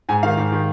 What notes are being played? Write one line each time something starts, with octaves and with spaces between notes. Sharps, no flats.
G#2 G#5
D#3 F5
G#2
D#3